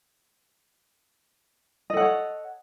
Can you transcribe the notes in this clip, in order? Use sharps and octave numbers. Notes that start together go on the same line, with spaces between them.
A4 C#5 D#5 F#5